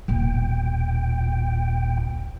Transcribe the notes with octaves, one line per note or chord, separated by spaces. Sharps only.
D#1 B1 A#2 G5